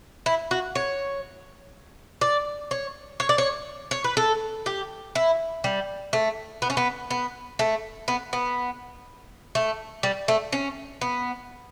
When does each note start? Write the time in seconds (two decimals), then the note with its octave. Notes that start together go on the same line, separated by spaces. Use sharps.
0.26 E4
0.51 F#4
0.75 C#5
2.21 D5
2.71 C#5
3.20 C#5
3.29 D5
3.38 C#5
3.91 C#5
4.04 B4
4.17 A4
4.66 G4
5.15 E4
5.64 G3
6.13 A3
6.62 B3
6.70 C#4
6.77 B3
7.10 B3
7.59 A3
8.08 B3
8.33 B3
9.55 A3
10.03 G3
10.28 A3
10.52 C#4
11.01 B3